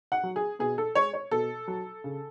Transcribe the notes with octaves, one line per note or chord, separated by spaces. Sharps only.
F#5
F#3
G#4
B2 G#4
A4
G#3 C#5
C#5
B2 A4
F#3
C#3